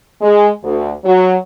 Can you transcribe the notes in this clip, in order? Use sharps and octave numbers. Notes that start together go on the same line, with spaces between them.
G#3
D2
F#3